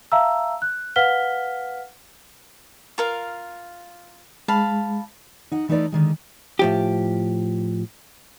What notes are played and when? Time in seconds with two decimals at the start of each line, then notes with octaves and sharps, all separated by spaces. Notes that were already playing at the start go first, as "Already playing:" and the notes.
0.12 E5 F5 A5 A#5 E6
0.62 F#6
0.96 B4 F5 F#5 F6 B6 G7
2.98 F4 A#4 F5
4.48 G#3 F5 A5 B5
5.51 D#4 F#5
5.69 E3 A3 D#4 B4 D5 A#5
5.92 D3 D#3 G#3
6.59 A2 F3 G4